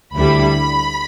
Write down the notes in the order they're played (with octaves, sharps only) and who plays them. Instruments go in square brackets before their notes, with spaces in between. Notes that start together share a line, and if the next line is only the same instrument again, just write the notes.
[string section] D2 D3 G3 E4 B5